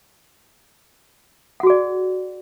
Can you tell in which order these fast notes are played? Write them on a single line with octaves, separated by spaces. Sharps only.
F#5 F#4 G#4 D5